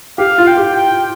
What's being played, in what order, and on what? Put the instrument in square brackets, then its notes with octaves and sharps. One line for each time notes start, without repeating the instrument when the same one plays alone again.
[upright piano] G4 [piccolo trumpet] F5
[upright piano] F4
[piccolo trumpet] G5
[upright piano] G4
[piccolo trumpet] G5